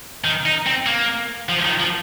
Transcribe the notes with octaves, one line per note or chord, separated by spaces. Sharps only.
D#3
D#4
C4
A#3
F3
D#3
F3